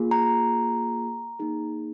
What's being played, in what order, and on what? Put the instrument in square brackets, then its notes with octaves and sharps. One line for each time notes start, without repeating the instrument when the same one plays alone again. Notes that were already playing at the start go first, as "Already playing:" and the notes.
Already playing: [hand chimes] A#3 F4 G#4
A#5
A#3 D#4 G#4